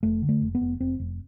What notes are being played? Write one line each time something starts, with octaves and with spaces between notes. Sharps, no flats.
F1 A3
D3
A3
F1
B3
F1
F1 C4
F1